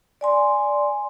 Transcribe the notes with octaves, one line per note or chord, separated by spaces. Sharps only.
D5 G#5 C6